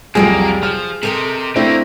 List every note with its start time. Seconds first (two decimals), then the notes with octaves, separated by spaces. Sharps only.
0.15 C2 F2 F#3 G3 A3 A#3 G#4
0.63 F3 F6
1.03 C3 G4 A4 A#4 D#5
1.56 A3 A#3 C4 D4 E4 G4